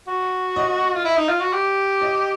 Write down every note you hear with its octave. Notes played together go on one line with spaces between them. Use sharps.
F#4
D#5
F4
E4
D#4
F4
F#4
G4
D#5